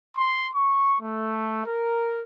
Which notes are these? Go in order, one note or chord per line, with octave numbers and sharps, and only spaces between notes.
C6
C#6
A3
A#4